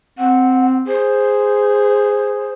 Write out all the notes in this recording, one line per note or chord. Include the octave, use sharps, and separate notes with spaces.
C4 F#5
G#4 C5